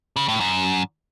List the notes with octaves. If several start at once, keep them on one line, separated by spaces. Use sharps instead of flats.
C#3
A2
F#2